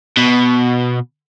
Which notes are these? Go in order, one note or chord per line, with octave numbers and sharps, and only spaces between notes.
B2